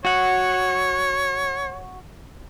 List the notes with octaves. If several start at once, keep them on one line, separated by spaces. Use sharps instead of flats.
F#4 C#5 F#5